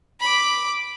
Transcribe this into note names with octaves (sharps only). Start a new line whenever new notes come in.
B5 D6